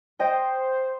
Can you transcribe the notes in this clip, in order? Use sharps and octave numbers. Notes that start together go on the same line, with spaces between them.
C5 D#5 G5